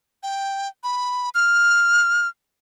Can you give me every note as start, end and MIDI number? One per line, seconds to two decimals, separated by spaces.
0.23 0.68 79
0.84 1.29 83
1.35 2.28 89